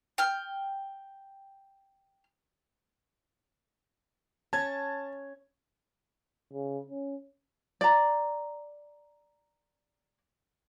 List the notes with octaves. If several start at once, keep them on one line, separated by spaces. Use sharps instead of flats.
G5 F6
C#4 A5 G#6
C#3
C#4
D5 A#5